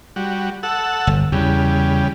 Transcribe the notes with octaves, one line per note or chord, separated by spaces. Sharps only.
G3 F#4
A4 F#5 E6
G1
E2 C#3 G3